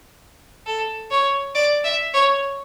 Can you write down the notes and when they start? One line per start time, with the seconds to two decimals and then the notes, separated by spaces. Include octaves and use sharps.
0.66 A4
1.11 C#5
1.55 D5
1.84 E5
2.14 C#5